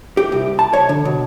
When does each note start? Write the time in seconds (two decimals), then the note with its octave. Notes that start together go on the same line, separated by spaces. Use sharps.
0.17 G4
0.32 C2
0.59 A5
0.73 C#5
0.89 D3
1.05 B2